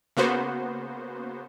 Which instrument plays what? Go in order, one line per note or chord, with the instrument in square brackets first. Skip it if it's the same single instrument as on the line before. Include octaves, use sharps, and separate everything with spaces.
[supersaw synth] C#3 A#3 B3 F#4 C5